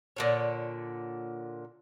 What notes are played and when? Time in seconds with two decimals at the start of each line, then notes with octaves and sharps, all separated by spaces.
0.16 A#2 D3 C#5